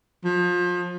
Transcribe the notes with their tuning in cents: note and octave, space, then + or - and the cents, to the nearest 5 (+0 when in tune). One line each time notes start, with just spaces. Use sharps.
F3 +30